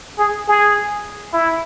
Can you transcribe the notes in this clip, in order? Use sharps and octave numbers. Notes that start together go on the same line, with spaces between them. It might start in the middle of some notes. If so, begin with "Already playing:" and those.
G#4
G#4
E4